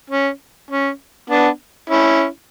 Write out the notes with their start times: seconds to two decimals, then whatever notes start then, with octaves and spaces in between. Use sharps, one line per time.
0.10 C#4
0.71 C#4
1.30 B3 D4
1.89 C#4 E4